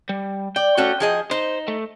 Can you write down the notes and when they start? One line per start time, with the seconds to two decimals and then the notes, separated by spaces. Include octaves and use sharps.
0.09 G3
0.56 D5 G5
0.77 A3 C#4 F#4
1.00 F3 G#4 D#5
1.31 D#4 C5
1.68 A3